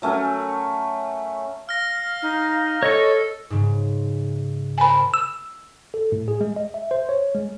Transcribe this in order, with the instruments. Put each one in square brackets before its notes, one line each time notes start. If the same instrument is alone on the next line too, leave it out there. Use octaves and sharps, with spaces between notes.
[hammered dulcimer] F#3 A3 C#4 A#4
[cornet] F5 [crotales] F6 A#6
[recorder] D#4
[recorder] A4 [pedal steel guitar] C#5 D#5 C#6
[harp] G#2 C#3
[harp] A#4 C5 A5 [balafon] G#5 B5
[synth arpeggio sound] E6
[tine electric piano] A4
A2
G#4
G#3
D#5
E5
C5
C#5
G#3